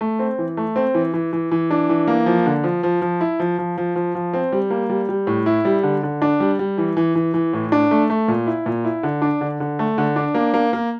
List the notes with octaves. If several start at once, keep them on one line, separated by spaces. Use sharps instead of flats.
A3
C4
E3
A3
C4
E3
E3
E3
E3
D4
E3
A#3
F3
D3
F3
F3
F3
E4
F3
F3
F3
F3
F3
C4
G3
A#3
G3
G3
A2
E4
G3
D3
D3
D4
G3
G3
E3
E3
E3
E3
A2
D4
A3
A3
A#2
E4
A#2
E4
D3
D4
D3
D3
A3
D3
D4
A#3
A#3
A#3